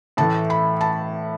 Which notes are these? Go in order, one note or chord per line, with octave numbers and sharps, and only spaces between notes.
A2 E3 A3 A5
B5
A5